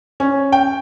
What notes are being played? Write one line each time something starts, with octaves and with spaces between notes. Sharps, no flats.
C#4
G5